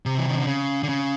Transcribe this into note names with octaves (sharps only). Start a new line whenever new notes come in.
C3
E3
D#3
D3
C#3
D3
C#3